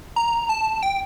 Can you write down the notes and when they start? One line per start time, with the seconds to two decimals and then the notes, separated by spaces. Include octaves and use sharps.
0.16 A#5
0.49 A5
0.83 G5